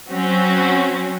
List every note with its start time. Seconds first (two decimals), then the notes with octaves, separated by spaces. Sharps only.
0.10 F#3 C4 C#4 F#4